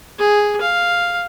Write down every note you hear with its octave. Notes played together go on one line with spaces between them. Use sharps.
G#4
F5